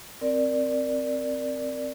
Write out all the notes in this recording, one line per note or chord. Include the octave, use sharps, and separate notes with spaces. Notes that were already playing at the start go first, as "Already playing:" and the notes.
C4 A#4 D5